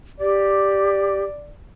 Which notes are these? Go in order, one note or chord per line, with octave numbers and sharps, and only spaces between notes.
G4 D5